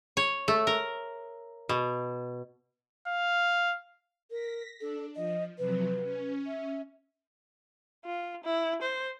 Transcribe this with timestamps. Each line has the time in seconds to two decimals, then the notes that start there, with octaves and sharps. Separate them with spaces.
0.17 C#5
0.48 A3
0.67 A#4
1.69 B2
3.08 F5
4.31 A#4 A#6 B6
4.81 D4 A4
5.16 F3 D#5
5.58 C3 F3 F#3 B4
6.03 C#4
6.47 E5
8.05 F4
8.44 E4
8.82 C5